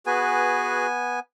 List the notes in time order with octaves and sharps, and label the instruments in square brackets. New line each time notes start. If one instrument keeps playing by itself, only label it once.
[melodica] B3 G#5 [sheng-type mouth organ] F#4 G#4 B4